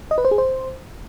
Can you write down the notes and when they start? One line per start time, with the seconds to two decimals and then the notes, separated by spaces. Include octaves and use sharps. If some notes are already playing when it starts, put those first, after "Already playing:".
0.11 D#5
0.18 B4
0.25 C5
0.31 G#4
0.38 C5